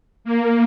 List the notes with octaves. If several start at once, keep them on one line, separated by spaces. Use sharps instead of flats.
A#3